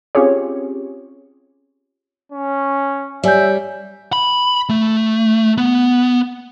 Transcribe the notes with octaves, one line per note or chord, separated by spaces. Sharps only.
C4 C#4 F4 G4 G#4 C#5
C#4
G3 C#5 E5 G#5 G6
B5
A3
B3